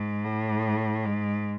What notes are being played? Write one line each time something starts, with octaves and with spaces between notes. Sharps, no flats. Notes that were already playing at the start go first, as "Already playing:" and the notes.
Already playing: G#2
A2
G#2